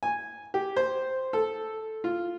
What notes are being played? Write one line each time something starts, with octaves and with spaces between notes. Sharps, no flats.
G#5
G4
C5
A4
F4